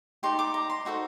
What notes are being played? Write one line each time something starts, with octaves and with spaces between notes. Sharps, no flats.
D#4 G4 D5 C6
D6
A#5
C6
D#4 F#4 A4 C5